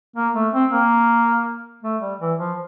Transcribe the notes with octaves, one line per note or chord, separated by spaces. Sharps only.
A#3
A3
C4
A#3
A3
G3
E3
F3